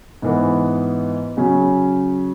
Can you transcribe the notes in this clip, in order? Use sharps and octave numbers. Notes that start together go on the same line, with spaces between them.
G#2 E3 B3
C#3 F#3 C#4